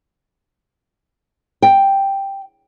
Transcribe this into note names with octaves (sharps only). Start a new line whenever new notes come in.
G5